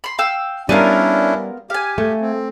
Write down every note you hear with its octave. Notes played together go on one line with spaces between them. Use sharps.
B5 C6
F5 G5 E6
G3 B3 C#4 D4 E4 F4 A#4
G4 F5 G#5
A3
C4